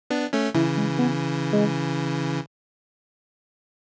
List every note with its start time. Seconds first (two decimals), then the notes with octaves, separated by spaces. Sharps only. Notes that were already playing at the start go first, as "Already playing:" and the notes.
0.10 B3 D4
0.33 A3 C#4
0.55 C#3 E3 E4
0.78 G#3
0.99 B3
1.53 G#3